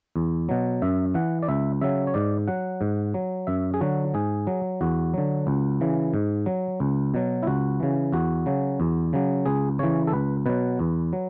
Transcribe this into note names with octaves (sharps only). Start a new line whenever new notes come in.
E2
B2 F#3
F#2 E5
E3 F#5
D5
C#2 E5
C#3 F#3 E5
C#5
G#2 D5
F#3 F#5
G#2
F#3
F#2 E5
G#4
D3 F#3 F#4
G#2 G#4
F#3
E2 F#4
D3 F#3
C#2
C#3 E3
G#2
F#3
C#2
B2 F#3
E4
C#2 F#4
C#3 E3
E2 F#4
C#3 F#3
E2
C#3 F#3
C#2 G#4
C#3 E3 C#5
A4
C#2 B4
B2 F#3 B4
E2
F#3